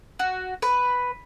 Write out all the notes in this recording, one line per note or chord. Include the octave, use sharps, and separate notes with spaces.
F#4
B4